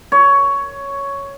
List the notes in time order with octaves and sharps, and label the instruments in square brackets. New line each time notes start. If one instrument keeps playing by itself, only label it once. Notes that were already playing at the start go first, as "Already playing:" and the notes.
[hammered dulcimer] C#5